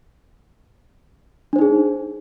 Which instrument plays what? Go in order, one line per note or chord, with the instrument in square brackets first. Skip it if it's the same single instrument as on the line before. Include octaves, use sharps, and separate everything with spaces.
[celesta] D4
C5
D#4
G#4